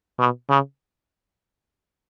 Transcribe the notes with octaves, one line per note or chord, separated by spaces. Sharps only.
B2
C#3